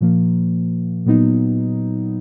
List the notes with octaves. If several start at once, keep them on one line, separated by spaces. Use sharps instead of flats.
A#2 F3 A#3
A#2 F#3 B3 D#4